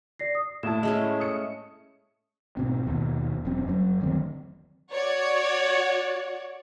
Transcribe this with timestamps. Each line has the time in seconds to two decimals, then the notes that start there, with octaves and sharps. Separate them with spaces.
0.19 D5 A#6 C7
0.35 D#6
0.63 A2 E4 A5 E7
0.83 G#3 A3 C#4
1.20 D#6 C#7
2.57 G#2 B2 C4
2.87 D#2 B2
3.45 E1 F#2 C4 C#4
3.68 F#1 F#3
4.01 D2 D#3 F#3 C4
4.92 F#4 C#5 D5